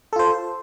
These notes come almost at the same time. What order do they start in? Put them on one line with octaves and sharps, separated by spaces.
A4 F4 C5